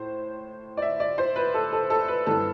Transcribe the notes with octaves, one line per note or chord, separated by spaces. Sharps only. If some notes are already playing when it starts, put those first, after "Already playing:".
Already playing: A2 C5
D5
E5
D5
C5
B4
A4
A4
A4
B4
G2 E3 B3 A4